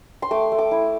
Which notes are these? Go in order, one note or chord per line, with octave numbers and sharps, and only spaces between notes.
C6
A3 D6
A3
D6
E4